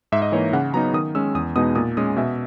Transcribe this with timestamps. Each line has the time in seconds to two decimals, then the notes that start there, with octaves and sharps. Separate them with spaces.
0.12 G#2 E5
0.22 D#5
0.32 E3 A#3 D#4 C#5
0.53 C#3 F#5
0.74 F#3 B3 D#4 A#5
0.94 D#3 D#6
1.15 G#3 C#4 E6
1.35 E2 D#6
1.56 B2 G#3 B3 D#4 D#6
1.75 A#2 D#6
1.97 G#3 C#4 D#6
2.16 B2 E5